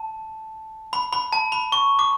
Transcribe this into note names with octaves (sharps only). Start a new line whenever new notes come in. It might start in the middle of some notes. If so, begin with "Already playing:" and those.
Already playing: A5
B5
B5
A5
B5
C#6
D6